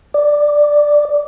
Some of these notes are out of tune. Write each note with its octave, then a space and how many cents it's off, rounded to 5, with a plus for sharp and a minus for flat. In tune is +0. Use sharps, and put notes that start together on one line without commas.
D5 +5